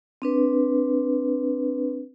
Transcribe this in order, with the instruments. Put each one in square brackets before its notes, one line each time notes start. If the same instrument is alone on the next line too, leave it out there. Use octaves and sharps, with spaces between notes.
[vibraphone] C4 D4 B4